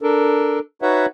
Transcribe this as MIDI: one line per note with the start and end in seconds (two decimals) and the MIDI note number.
0.01 0.59 62
0.01 0.59 69
0.01 0.59 70
0.82 1.06 63
0.82 1.06 66
0.82 1.06 71
0.82 1.06 73
0.82 1.06 76
0.82 1.06 78